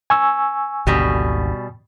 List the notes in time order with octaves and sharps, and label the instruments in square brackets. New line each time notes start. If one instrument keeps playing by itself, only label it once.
[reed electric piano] G#5 C#6 E6
[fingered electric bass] G#1 D2 D3 [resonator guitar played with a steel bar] B2 G3